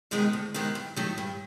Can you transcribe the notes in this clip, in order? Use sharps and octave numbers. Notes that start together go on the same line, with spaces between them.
C3 D#3 G#3 B3
D2
C3 D#3 G#3 B3
G2
D#3 F#3 A3
G2